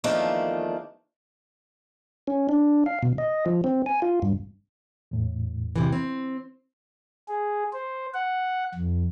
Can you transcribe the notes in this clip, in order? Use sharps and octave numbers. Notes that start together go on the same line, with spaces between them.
E2 D#3 F3 A3 A#3 D4
C#4
D4
F5
B2
D#5
F3
C4
G#5
F4
G2
E2 A2
C3 E3
C4
G#4
C5
F#5
F2